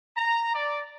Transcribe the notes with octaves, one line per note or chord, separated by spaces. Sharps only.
A#5
D5